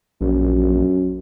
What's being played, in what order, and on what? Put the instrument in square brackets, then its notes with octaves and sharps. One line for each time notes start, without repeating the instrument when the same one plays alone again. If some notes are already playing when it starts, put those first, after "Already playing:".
[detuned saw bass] A#1 [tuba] F#2